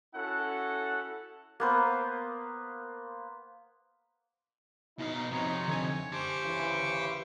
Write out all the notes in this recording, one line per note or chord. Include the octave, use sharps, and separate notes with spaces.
C#4 E4 F#4 A4 F#5
A#3 B3 C5
B2 D#4 F5
F2 C3 C#5
D3 G#5
G4 C5 A5 C#6 D6
D#2 C#3 E3